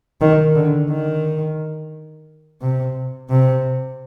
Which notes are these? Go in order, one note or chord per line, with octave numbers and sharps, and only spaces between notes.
D#3
D3
D#3
C3
C3